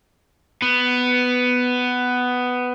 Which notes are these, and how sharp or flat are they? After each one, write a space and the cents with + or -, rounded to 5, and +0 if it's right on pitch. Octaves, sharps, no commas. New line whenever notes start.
B3 +10